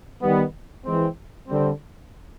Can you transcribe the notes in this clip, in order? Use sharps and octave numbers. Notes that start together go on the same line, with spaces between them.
D#3 G3 B3
E3 G#3 C4
D3 G3 C4